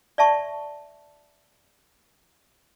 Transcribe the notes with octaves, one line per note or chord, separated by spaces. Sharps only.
D5 E5 A5 C#6